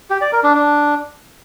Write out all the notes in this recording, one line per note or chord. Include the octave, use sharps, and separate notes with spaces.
G4
D5
A#4
D4
D4